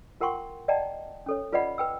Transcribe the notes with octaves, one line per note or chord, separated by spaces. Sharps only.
F4 A#4 F#5 G5 C6 C#6
D5 D#5 F#5 G5 A5 A#5
C#4 A4 C#5
F4 B4 D5 D#5 F#5 B5
B4 G5 E6